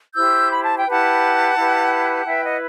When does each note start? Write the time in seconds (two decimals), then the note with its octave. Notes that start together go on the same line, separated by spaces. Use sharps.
0.15 E4 G4 C5 E6 G6
0.51 B5
0.63 A5
0.77 G5
0.86 E4 G4 B4 F#5 A5
1.56 E4 G4 B4
2.26 E4 B4 E5 G5
2.43 D#5 F#5